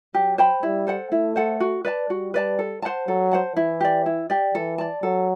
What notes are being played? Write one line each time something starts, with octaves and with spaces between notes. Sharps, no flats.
F#3 G4
C5 G5 B5
G3 E4
A4 C5 F#5
A3 E4
A4 C5 F#5
F#4
B4 D5 A5
G3 F#4
B4 D5 A5
A4
C5 F#5 A5
F#3 A4
C5 F#5 A5
E3 E4
G4 D5
E4
G4 D5
E3 A4
D5 A5
F#3 A4